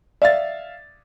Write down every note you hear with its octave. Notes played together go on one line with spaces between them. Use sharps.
D5 E5 F5 A6